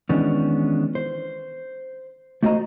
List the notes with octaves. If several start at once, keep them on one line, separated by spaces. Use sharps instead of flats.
D#3 E3 G#3 B3 C#4 D4
C5
A3 E4 F#4 C5 D#5 A#5